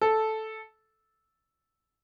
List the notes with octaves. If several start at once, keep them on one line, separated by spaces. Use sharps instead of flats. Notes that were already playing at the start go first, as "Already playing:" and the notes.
A4